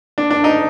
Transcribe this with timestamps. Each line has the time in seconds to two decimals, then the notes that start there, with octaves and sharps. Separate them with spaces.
0.18 D4
0.30 D4
0.44 D#4